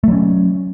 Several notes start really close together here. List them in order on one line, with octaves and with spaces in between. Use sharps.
A3 F#3 C#4